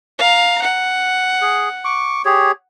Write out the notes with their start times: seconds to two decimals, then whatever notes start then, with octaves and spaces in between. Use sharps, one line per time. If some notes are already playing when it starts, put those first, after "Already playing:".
0.18 F5 A#5
0.62 F#5
1.42 G#4
1.85 C#6 D6
2.25 G4 G#4 C#5